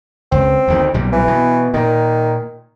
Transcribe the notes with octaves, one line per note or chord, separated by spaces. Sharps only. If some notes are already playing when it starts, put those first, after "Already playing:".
C#2 C4
D2 D#3
B1 A#2 G3
E3
B2
A#2 D#3